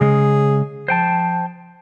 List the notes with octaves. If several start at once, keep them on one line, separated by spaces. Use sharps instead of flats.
C#3 G#3 G#4
F3 C5 G5 A5